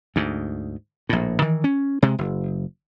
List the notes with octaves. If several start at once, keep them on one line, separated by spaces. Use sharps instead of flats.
D2 G#2
A#1 A2
D#3 E3
C#4
C3 G#3
F#1